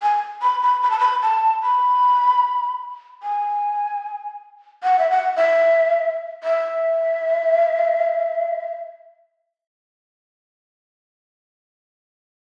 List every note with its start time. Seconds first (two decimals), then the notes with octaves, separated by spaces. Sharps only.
0.03 G#5
0.42 B5
0.62 B5
0.83 B5
0.90 A5
0.99 B5
1.22 A5
1.63 B5
3.23 G#5
4.84 F#5
4.99 E5
5.10 F#5
5.36 E5
6.44 E5